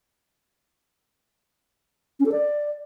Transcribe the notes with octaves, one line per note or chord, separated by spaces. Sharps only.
C#4
A4
D5